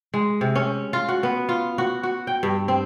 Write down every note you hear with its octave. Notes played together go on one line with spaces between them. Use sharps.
G#3
C3
C#4
F4
F#4
B3
F4
F#4
F#4
G5
G2
C4